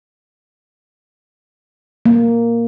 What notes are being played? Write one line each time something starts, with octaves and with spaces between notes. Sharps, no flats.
A#3